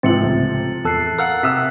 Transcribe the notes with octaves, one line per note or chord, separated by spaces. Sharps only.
G#2 C3 E3 F3 C4 A6 C#7 F#7
C#2 A2
E2 A4 A5 F#6 C7
A#4 F5 F#5 E6 F#6 F#7
C3 D#6 E6 B6